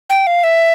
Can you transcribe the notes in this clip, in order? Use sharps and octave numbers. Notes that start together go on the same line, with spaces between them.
G5
F5
E5